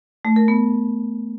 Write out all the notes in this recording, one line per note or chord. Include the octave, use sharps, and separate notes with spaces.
A3
A#4
B3